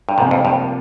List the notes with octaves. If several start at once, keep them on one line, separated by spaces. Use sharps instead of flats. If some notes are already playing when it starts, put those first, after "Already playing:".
G2
G#2 C3 F3 A#3 F4 A#4
F2
G2